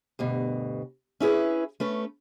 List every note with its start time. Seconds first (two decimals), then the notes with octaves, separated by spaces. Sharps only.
0.19 D2 G2 B2
1.20 C#4 E4 G#4 B4
1.80 A3 C#4 B4